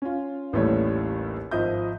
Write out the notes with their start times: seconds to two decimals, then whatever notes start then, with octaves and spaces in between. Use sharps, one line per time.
0.02 C#4 F4
0.53 A1 D#2 A2 G3 A3 C#5
1.51 G#1 F3 D#5 E5 G6